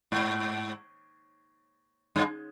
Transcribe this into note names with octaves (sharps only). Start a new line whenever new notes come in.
G#2
G2